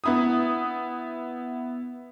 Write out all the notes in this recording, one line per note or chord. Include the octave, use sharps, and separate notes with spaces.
B3 E4 D#6